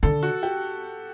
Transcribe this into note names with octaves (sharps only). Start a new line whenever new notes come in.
D3 A4
F#4
G4